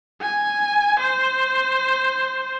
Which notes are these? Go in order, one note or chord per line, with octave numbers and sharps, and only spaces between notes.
G#5
C5